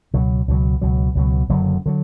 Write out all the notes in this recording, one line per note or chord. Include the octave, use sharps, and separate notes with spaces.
C#2 B2 F#3
C#2 B2 F#3
C#2 B2 F#3
C#2 B2 F#3
F#1 F#2 D3 F#3
D3 F#3